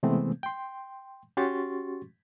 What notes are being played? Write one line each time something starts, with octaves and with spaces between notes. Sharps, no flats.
C3 E3 G#3 A3 B3 C4
G5 C6
C#4 F#4 G4 C6 C#6 A6